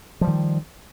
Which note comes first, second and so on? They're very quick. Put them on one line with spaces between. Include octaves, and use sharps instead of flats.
F3 G3 D#3